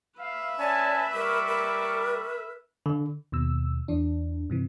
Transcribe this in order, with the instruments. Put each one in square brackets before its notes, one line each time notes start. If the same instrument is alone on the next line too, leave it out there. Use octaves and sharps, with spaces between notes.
[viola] B4 E5 [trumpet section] F5
[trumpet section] C#4 G#5 A5 [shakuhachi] D5
[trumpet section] G3 C#6 D6 [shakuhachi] A#4
[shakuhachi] A#4
[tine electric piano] D3
[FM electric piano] D#2 B2 E6
E2 E3 D4
G2 C3 E3